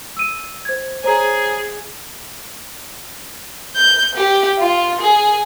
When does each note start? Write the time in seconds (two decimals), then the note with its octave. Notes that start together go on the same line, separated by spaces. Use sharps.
0.17 E6 D#7
0.65 C5 G#6
1.04 G#4 C5 C#5 A#5
3.76 G6
4.16 G4
4.59 F4
5.01 G#4